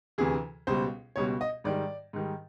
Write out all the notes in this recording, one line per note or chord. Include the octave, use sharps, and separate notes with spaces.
D2 C3 E3 G#4
C#2 B2 G3 C5
C#2 B2 G3 C#5
D#5
G#2 D#3 G3 D5
G#2 D#3 G3